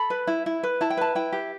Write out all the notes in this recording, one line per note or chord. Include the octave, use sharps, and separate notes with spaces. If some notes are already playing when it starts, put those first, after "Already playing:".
Already playing: A4 B5
B4
E4
E4
B4
E4 A5
G5
B4 A5
E4 G5
G4